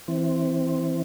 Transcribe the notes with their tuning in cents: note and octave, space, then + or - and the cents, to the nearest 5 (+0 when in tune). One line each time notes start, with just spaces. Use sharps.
E3 +0 C4 +0